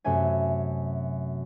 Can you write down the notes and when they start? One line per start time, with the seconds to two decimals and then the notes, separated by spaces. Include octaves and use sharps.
0.04 F#2 C3 A3 E5 G#5